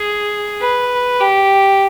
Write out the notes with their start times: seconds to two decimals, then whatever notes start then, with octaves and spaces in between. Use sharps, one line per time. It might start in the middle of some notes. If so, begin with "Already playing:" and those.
Already playing: G#4
0.61 B4
1.20 G4